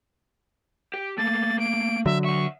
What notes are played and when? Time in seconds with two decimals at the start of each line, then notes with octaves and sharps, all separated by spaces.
0.94 G4
1.18 A3 A#3 A6
1.59 D7
2.06 D3 F#3 E5
2.24 E5 F#5 C#6